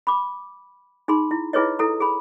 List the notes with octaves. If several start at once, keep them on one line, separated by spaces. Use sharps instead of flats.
B5 D6
D#4 G#4 B5 C6
E4
E4 F4 G#4 B4 C#5 D#5
E4 A4 A#5
G#4 B5